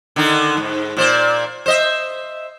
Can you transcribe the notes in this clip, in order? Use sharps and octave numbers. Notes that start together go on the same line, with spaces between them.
D3 D#3 D#4
G#2
A#2 C5 D5
C5 D#5 E5